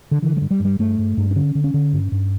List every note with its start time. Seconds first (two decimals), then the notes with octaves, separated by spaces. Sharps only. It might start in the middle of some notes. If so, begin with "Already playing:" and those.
0.11 D3
0.22 D3 E3
0.36 G3
0.41 G2
0.51 G3
0.60 G2
0.65 G3
0.79 G2 A3
0.98 G2
1.17 G2
1.31 D4
1.36 D3 C#4
1.55 D3
1.64 C#4
1.74 D3
1.93 G2
2.12 G2